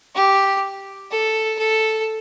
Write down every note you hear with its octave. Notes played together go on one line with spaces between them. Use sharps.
G4
A4
A4